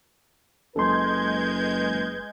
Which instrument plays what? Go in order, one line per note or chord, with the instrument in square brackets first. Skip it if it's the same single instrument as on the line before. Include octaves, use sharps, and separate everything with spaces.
[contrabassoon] F#1 [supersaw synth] G#3 G6 G#6 [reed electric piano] A4 C6 [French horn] B4